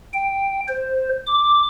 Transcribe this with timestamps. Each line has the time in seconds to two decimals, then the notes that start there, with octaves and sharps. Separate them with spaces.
0.13 G5
0.68 C5
1.27 D6